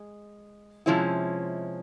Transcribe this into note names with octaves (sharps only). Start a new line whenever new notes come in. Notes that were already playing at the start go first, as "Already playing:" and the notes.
Already playing: G#3
C3 F3 G#3 C#4 E4